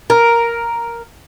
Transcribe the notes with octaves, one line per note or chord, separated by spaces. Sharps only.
A#4